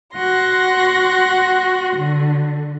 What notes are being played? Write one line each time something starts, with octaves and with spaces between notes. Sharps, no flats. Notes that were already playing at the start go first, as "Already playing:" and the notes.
F#4 F#5 C6 A#6
D3